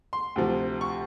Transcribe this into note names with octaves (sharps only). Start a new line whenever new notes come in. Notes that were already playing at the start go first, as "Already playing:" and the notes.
C6
D2 C3 F3
C#6